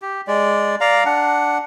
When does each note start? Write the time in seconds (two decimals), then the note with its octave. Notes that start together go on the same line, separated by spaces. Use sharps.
0.02 G4
0.27 G#3 D5
0.81 D5 F5 A#5
1.06 D4 F#5